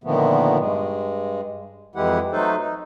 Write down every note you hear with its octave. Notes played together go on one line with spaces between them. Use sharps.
A#2 D3 D#3 F3 A3 B3
G2 G#3
F2 E3 G#3 E4 G4 F#5
F#3 A3 D#4 A4 B4 C5
D#4